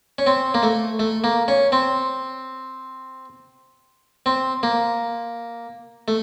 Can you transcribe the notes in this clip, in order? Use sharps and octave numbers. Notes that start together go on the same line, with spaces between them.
C#4
C4
A#3
A3
A3
A#3
C#4
C4
C4
A#3
A3